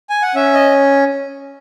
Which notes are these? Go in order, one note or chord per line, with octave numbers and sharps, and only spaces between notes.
G#5
F#5
C#4 E5
D#5